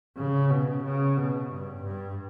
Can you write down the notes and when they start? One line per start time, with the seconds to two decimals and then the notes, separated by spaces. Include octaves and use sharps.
0.17 C#3
0.50 B2
0.84 C#3
1.17 B2
1.50 G2
1.83 G2